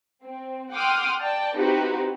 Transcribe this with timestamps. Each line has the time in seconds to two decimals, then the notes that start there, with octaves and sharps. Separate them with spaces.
0.24 C4
0.72 F#5 G5 C6 D6 D#6 F6
1.19 D5 G5 A5
1.56 C4 D#4 E4 F#4 G4 B4